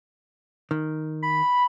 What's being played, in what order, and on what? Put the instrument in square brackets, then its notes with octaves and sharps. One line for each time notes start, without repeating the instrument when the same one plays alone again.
[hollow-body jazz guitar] D#3
[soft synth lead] B5